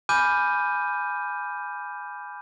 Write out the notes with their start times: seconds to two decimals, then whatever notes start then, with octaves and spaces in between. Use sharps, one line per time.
0.09 G#5 B5 D6 F6 G6 D#7